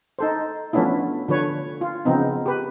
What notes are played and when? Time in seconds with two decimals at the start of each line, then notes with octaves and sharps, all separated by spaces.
0.19 D#4 A4 C5
0.73 F3 A3 B3 C#4 D4 E4
1.28 D3 F3 B4 C#5
1.81 F4
2.05 C#3 F3 B3 C4 D#4
2.46 G4 B4